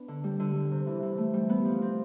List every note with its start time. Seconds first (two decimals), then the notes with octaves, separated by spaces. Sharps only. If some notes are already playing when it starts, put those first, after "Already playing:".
Already playing: B3 D4
0.08 D3
0.24 G3
0.40 D3
0.55 G3
0.71 C3
0.86 E3
1.03 E3
1.18 A3
1.34 G3
1.49 B3
1.65 F3
1.82 C4